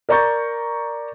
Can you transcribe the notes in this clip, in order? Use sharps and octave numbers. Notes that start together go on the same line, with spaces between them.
A#4 D5 A#5 C#6 G6 A6